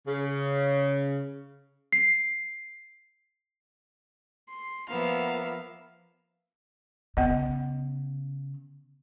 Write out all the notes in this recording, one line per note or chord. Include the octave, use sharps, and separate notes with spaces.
C#3
C7
C6
F3 A#3 B3 E5 F5
C#3 B3 D#5